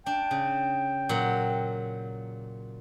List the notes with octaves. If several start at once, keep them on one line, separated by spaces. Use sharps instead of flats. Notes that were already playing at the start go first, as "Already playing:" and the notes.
D4 G5
C#3
A#2 F#3 F#5